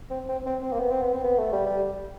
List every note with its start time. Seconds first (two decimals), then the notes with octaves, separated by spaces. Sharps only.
0.10 C4
0.29 C4
0.46 C4
0.62 C4
0.72 A#3
0.79 B3
0.90 C4
1.01 B3
1.13 C4
1.24 B3
1.38 A3
1.52 G3
1.66 G3